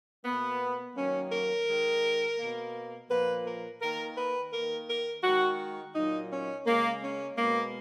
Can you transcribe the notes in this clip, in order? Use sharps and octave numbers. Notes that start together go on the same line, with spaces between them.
B2 A#3 B3
D#3 F#3 A#3 C#4
A#4
D#3 G#3
B2 A#3
A#2 F3 A#3 B4
A#4
D#3 A#3 A#4
B4
D#3 A#3 A#4
A#4
D#3 G#3 F#4
A#2 F#3 A#3 D#4
C#4
C#3 G#3 A#3
C#4
B2 G#3 A#3